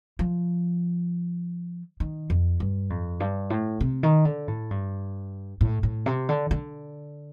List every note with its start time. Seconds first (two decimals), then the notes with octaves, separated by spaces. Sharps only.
0.19 F3
2.00 D#3
2.30 F2
2.60 G2
2.90 F2
3.20 G2
3.50 A2
3.81 C3
4.03 D#3
4.25 D3
4.48 A2
4.71 G2
5.61 A2
5.83 A2
6.06 C3
6.29 D3
6.51 D3